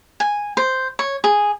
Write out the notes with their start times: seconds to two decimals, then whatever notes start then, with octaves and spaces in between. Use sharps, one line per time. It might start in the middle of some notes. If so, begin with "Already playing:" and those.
0.20 G#5
0.57 C5
0.99 C#5
1.24 G#4